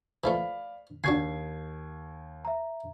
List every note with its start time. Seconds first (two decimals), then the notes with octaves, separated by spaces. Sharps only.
0.24 E3 F3 A3 D5 F5 B5
1.04 D#2 D4 F#4 G#5 G#6 C7
2.45 E5 A#5